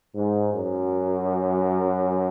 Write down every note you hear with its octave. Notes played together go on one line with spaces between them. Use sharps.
G#2
F#2